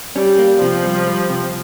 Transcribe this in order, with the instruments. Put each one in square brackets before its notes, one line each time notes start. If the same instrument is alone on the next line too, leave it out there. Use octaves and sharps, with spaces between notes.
[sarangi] G3 [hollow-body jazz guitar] C#4
[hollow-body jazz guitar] A#3
[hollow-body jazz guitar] C3 [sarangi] F3
[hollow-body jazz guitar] G3
G3
C3